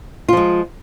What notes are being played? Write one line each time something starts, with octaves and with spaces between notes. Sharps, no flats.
F3 G#3 F4